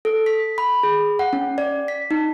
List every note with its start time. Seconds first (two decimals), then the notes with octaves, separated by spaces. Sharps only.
0.05 A4
0.26 B6
0.58 B5
0.83 G#4
1.19 F#5
1.33 C#4
1.58 D5
1.88 B6
2.11 D#4